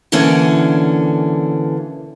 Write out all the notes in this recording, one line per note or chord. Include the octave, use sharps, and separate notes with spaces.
B2 D3 E3 A#3 C#4 D4